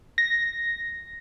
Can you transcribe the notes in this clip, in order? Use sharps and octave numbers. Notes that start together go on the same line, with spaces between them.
A#6